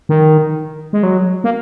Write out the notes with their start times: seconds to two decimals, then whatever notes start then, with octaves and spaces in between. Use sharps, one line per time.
0.09 D#3
0.93 G#3
1.03 F#3
1.44 A#3